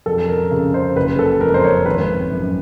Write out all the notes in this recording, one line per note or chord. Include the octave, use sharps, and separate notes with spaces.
F2 A4
A#4
C#3
C5
F#1 B4
A4
F2 A#4
C5
C#5
G#1 B4
F#2